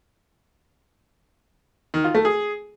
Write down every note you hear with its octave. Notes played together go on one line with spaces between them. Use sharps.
D#3
F4
A3
G#4